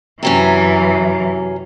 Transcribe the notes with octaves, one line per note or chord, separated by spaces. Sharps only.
F#2 C3 E3 F#3 C#4